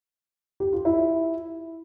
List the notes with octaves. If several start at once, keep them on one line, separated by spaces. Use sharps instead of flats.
G4
F4
E4